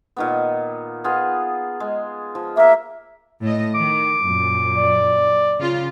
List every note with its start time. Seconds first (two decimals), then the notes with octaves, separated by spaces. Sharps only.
0.17 A#2 D#3 B3
1.04 B3 F4 G#4
1.80 G#3
2.35 F3
2.57 A#3 A#4 E5
3.43 A2 D#5
3.75 D#3 D6
4.25 F#2 A#2
4.78 D5
5.60 C#3 F4